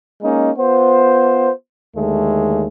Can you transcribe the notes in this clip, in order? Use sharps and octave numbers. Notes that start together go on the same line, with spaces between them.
G#3 A#3 C#4 D#4
B3 F4 C5
D#2 D3 G#3 A3